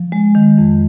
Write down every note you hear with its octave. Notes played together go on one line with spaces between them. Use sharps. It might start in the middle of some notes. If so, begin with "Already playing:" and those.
Already playing: F3
G#3
D#3
F2